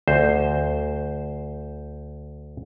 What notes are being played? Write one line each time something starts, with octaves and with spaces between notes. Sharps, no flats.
D2 C5